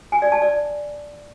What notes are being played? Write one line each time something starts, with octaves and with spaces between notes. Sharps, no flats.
G#5
D5
A5
D5